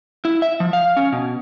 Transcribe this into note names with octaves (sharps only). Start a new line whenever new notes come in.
E4
E5
F3
F5
C#4
B2